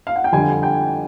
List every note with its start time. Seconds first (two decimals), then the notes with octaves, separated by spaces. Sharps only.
0.07 F5
0.16 F#5
0.24 G5
0.32 F2 D3 G3 G#5
0.63 G5